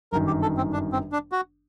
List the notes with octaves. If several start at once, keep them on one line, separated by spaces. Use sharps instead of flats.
G1 F#2 D#3 A#4
G4
A4
C4
D4
C4
D4
F#4